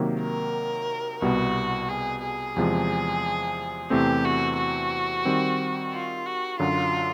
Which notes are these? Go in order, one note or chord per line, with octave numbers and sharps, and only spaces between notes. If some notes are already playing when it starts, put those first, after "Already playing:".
Already playing: C3 D#3 F#3 A#3
A#4
C2 B2 G3 B3 F#4
G#4
G#4
E2 C3 F3 G#3
E2 C3 E3 A3 C4 G4
F#4
F#4
D#3 G3 C4
F4
F#4
F#2 D3 F#3 F4